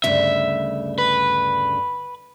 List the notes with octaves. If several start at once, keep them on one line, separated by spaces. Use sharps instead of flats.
D2 G2 C#3 E5
B4